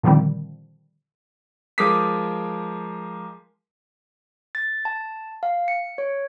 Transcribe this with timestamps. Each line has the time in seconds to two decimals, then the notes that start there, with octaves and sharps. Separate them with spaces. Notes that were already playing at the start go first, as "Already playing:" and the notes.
0.03 A#2 D3 D#3 F3 G3 C4
1.78 F3 G#3 A#4 D6 D#6 B6
4.55 A6
4.85 A5
5.43 F5
5.68 C#7
5.98 C#5